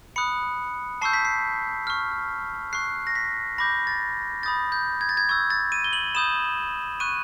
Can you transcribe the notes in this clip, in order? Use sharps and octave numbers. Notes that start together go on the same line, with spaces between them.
B5 D#6 F#6 C#7
A5 C#6 E6 G6 C7
B6
C7
C#6 F6
C#6 F#6 C7
A#6
B6
B5 D6 G6 A#6
A6
B5 D#6 G6 A6
G6
G#6
A6
G#6
C#6 E6 G6 G#6
A6
D#7
G7
F#7
B5 D#6 G6 E7
C#6 F#6 D#7